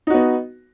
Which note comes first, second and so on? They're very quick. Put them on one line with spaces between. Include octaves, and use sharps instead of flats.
D#4 F#4 B3